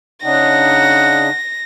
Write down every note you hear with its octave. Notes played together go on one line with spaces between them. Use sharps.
C#3 D4 D#4 F#5 A#6